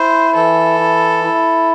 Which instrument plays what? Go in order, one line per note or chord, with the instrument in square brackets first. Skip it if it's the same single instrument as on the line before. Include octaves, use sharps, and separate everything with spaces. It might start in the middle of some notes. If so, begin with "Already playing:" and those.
Already playing: [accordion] E4 [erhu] C5
[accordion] E3 [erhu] A4
[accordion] E4
E4